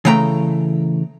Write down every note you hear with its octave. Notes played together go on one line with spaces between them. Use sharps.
C#3 E3 A3 G5 A#5